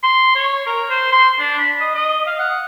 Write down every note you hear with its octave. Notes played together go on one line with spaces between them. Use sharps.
C6
C#5
A#4
C5
C6
D4
B5
D#5
D#5
F5
F#5